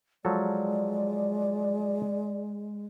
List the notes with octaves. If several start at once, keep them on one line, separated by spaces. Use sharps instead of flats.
F3 F#3 G#3 A4 D5